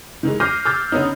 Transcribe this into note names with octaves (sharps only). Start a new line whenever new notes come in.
D#3 E3 G#3
D6 F6 G6 A#6 C7 D#7
D6 E6 F6 G6 A6
D3 B3 C#4 D#4